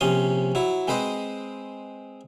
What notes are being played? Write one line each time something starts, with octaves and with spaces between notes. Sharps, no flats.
A#1 C3 C#4 C6 D#6
F#3 E4
G#3 C4 B4 C5 D#5